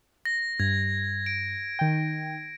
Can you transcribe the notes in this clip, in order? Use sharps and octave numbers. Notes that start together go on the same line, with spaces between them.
A#6
G2 G#6
D7
D#3 G5